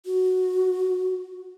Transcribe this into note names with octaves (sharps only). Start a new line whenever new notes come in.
F#4